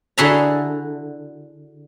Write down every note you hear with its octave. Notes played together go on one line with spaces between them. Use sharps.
D3 E4 F#4 G#4 E5 A#5